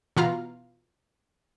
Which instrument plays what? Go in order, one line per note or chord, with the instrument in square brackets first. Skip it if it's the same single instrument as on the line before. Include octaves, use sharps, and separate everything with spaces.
[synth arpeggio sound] B2 E3 F4 F5 A#5